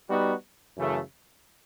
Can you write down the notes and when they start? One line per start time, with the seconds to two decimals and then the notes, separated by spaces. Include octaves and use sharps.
0.10 G3 B3 D#4 F#4
0.77 F#2 C#3 E3 A3